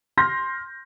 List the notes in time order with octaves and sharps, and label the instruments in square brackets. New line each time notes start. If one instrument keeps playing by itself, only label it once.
[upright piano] C6 F6 G6 A#6